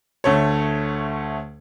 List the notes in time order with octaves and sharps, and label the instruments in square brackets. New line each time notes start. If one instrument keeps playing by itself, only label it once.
[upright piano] D2 A3 C#5